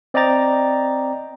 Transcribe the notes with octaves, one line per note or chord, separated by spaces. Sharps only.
C4 D5 D#5 G5 A#5 A6